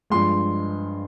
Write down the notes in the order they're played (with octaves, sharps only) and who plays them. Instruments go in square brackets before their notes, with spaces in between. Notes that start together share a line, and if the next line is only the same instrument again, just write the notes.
[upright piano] G2 F3 G#3 C6